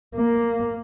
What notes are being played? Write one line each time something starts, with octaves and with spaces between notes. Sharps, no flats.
A#3